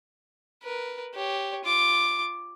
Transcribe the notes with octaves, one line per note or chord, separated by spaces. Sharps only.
A#4 B4
G4 C#5
F4 D6